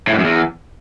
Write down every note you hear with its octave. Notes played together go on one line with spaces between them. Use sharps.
A2
G#2
F#2
E2